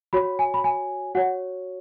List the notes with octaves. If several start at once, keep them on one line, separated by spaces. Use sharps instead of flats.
F#4 C#5 B5
G#5
B5
G#5
F#4 C#5 F#5